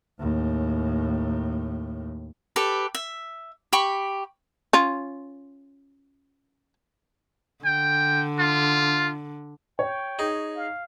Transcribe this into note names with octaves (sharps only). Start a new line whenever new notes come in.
D#2 A2
G4 A4 B4
E5
G4 G5 B5 C#6
C#4 F4
D3 G5
F4
C#5 G5
D#4 G#4
F5